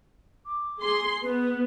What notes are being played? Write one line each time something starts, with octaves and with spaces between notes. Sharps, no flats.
D6
G#4 C6
B3 B4